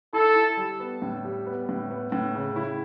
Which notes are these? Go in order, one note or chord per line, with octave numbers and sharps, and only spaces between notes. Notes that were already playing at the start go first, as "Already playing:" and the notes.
E4 A4
E4
G3
B3
A2
G3
B3
A2
B3
A2
C#3
E4